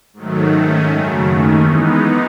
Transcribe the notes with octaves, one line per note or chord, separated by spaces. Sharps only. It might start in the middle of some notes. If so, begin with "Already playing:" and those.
G#2 D#3 F#3 A3
G#2 D#3 A3 C#4
F#2 C#3 F#3 A3
D#2 D#3 A3 C#4
E3 G#3 B3 D#4